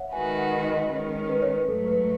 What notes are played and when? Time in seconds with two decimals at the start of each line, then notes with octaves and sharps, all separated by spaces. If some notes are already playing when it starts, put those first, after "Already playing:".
Already playing: C#5 E5 F#5
0.12 D#3 G#3 D#4 F#4 B4 G#5
0.38 F#5
0.64 D#5
0.91 D#3 G#3 C#4
1.29 B4
1.42 C#5
1.54 B4
1.68 G#2 F#3 A3 A4
1.87 B4